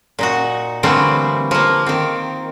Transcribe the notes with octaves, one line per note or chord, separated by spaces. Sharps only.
A#2 D#4 F#4
D3 E3 G3 A3 A#3 C4
F3 A#3
D#3 C4